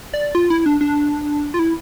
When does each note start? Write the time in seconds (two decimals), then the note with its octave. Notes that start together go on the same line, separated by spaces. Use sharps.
0.14 D5
0.35 F4
0.50 E4
0.66 D4
0.81 D4
1.54 F4
1.59 E4